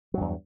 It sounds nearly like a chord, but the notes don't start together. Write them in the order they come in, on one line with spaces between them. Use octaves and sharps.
F#3 G2 E2